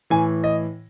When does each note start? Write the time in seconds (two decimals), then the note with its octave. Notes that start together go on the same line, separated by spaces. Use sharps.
0.10 A2 E3 G#5
0.44 D#5